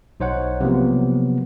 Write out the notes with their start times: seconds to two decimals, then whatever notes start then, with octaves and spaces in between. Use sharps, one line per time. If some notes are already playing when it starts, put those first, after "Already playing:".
0.20 B1 D#4 C5 C#5 F#5
0.61 C3 F3 F#3 A#3 B3